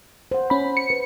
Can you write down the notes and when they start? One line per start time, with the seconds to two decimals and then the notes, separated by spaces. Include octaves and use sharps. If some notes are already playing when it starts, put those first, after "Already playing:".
0.31 C5 F#5
0.50 C#4 B5
0.77 C#7
0.90 B4